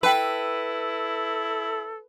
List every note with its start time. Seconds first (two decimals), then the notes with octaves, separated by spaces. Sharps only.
0.03 E4 A4 B4 G5 A5